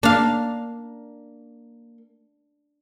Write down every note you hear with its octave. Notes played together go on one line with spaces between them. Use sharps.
A#3 D4 F5